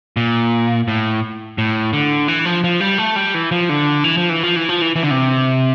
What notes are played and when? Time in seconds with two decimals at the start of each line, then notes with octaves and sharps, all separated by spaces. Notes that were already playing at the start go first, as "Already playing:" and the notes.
0.17 A#2
0.88 A2
1.58 A2
1.93 D3
2.28 E3
2.45 F3
2.64 F3
2.81 G3
2.98 A3
3.16 G3
3.34 E3
3.51 F3
3.69 D3
4.04 E3
4.17 F3
4.30 E3
4.43 F3
4.56 E3
4.69 F3
4.82 E3
4.96 E3
5.03 D3
5.11 C3